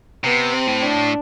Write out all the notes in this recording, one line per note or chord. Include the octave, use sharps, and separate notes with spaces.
C3 B3
C4
A2
D4